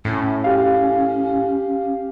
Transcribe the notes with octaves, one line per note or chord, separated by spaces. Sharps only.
A2 C#4
G4 F5